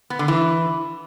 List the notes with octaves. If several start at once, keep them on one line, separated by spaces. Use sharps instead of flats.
B3
D3
E3